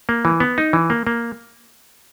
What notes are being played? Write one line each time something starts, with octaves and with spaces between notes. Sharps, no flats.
A#3
E3
B3
D#4
E3
A#3
A#3